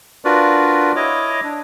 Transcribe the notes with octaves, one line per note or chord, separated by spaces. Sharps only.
D4 F4 F#4 A#4 B4 D5
E4 C#5 D#5 D6
D4